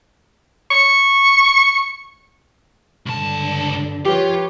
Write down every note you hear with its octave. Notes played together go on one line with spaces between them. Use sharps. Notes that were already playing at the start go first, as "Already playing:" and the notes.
C#6
C#2 G2 D3 A5
F3 F4 G4 B4 C#5